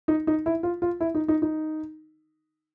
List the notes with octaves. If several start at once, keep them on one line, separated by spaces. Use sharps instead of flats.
D#4
D#4
E4
F4
F4
E4
D#4
D#4
D#4